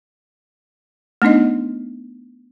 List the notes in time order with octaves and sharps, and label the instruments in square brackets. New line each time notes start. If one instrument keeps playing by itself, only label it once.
[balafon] A3 B3 D4 D#4 D#5